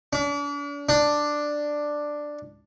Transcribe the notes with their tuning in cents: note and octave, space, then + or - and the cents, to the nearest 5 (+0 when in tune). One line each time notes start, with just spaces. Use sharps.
D4 -40
D4 +5